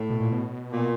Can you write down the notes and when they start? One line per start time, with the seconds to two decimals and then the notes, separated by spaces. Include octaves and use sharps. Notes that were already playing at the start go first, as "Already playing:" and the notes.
Already playing: A2
0.10 B2
0.21 A#2
0.32 B2
0.73 A#2